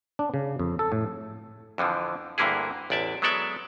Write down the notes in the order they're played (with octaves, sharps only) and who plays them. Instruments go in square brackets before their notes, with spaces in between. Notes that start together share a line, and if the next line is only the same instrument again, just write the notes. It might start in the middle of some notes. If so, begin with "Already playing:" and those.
[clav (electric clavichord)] D4
C#3
F2
A4
A2
F2 D3 E3 F3
D2 G2 D3 A#3 E4 G#4
A1 E2 D5 E5 A5
F#3 G#3 B3 A4 D5 E5